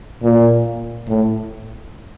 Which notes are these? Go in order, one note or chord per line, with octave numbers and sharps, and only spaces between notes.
A#2
A2